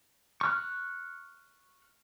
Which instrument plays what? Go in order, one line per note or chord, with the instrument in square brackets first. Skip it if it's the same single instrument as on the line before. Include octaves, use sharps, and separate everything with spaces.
[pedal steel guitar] C#6 F6 F#6